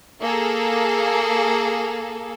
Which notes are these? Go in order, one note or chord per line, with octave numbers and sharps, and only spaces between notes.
A#3 G#4 A4